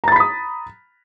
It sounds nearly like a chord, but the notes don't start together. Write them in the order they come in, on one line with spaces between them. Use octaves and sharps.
A#5 A6 B5 B6 D#6